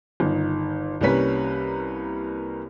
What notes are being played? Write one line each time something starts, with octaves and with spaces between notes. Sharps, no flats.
G1 D#3
C2 G3 A#3 C#4 B4 B6